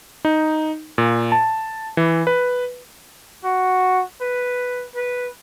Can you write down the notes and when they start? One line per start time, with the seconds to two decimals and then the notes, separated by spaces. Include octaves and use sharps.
0.25 D#4
0.98 A#2
1.32 A5
1.97 E3
2.27 B4
3.44 F#4
4.21 B4
4.95 B4